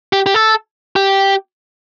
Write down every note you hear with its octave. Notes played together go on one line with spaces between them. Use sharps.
G4
G4
A4
G4